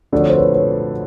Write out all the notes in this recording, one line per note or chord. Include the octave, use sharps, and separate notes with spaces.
F2 D3 F#3 A3 D5
C#5
C5
B4 C#5
B4 C#5